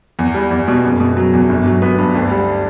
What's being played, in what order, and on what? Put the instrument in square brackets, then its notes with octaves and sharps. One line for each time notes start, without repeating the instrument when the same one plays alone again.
[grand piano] E2
G3
E2
B2
F#1
B2
F#3
E2
G1
F#3
B3
G2
D2
G3